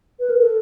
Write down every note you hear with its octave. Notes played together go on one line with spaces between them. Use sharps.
B4
A#4
A4